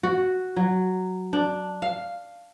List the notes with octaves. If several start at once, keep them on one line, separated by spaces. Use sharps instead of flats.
F#4
F#3
D4
F5